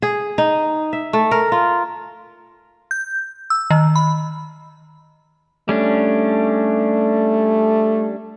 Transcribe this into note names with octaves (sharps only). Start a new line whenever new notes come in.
G#4
D#4
E5
A3
A#4
F4
G6
E6
D#3
B5
G3 A3 C#4 D4